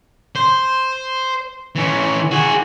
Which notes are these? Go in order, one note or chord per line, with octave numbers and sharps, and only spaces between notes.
C5
E3 C#4
F#4 G#4